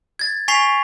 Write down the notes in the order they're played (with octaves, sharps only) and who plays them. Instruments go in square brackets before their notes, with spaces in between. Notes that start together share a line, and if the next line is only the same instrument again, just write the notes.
[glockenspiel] G#6 A6
G#5 C#6 B6 C7 F7